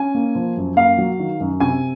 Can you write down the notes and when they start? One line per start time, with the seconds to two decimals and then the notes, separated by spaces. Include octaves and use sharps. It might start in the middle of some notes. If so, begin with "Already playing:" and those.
Already playing: C#4 G#5
0.15 A#3
0.35 F3
0.57 F#2
0.77 A#3 F5
0.98 F#3
1.19 D#3
1.40 F#2
1.60 C3 G#5